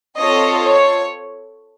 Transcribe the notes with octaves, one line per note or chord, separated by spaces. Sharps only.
C4 F4 A4 C#5 D#5
C#5